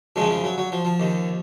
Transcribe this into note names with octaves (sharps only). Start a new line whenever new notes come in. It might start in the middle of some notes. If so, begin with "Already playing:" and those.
F#2 C#3 F3 G#3
F3
F#3
F#3
F3
F3
D#2 D#3